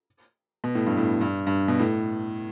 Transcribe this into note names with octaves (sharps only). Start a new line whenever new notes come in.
B2
A2
G2
A2
G2
G2
B2
A2